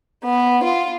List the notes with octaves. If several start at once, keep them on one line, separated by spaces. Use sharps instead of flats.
B3
F4